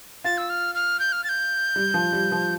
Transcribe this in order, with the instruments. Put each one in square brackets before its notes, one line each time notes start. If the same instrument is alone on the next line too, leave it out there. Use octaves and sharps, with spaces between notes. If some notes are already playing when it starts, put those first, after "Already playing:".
[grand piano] F4 [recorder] A6
[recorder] E6
F6
F6
G6
F6
A6
G6
[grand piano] G3
F3
G3
F3